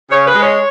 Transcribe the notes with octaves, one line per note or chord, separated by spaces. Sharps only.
C#3 C#5
B4
G#3
C#5